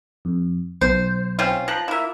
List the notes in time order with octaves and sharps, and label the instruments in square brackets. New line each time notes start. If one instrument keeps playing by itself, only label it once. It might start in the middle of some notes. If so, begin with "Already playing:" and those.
[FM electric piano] F2
[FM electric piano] B1 [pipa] C5
[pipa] C4 C#4 F4
[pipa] F3 [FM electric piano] A#5 F#6
[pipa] A#3 E4 [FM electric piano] F4 E5